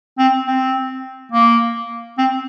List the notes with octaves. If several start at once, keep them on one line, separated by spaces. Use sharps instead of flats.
C4
C4
A#3
C4